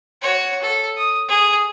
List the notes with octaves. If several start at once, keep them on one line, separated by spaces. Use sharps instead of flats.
F#4 C#5
A4
D#6
G#4